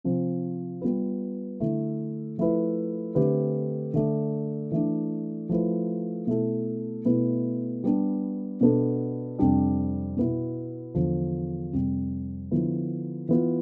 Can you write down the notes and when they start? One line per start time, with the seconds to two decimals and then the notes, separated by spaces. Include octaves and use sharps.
0.04 C3 F3 C4
0.82 G3 B3 F4 B4
1.60 D3 A3 E4
2.38 F3 A3 E4 B4
3.15 D3 A3 C4 G4 B4
3.94 D3 A3 D4
4.72 E3 A3 D4
5.49 F3 A3 E4 B4
6.27 B2 A3 E4 A4
7.05 B2 A3 E4 B4
7.84 G3 B3 D4
8.61 B2 B3 D4 A4
9.39 F2 C3 G3 D4
10.17 B2 B3 E4
10.95 E2 D3 F3
11.73 F2 C3 G3
12.51 D3 F3 B3 E4
13.29 E3 B3 F4